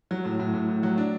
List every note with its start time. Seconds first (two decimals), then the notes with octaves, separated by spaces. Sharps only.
0.11 F#3
0.25 A2
0.40 A2
0.54 A2
0.69 A2
0.83 F#3
0.98 D4